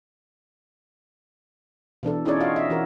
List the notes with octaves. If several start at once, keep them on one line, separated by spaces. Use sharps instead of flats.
B2 E3 D4 A4
C#4 D#4 E4 G#4 C#5 D5
F4 F#4 C#5 D#5 F5
D#5 E5
E3 F#4 A#4